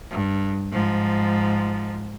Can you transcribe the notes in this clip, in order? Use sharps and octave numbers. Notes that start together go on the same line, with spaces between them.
G2
G#2 F3